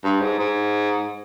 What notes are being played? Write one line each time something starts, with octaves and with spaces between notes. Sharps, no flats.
G2
G#2
G#2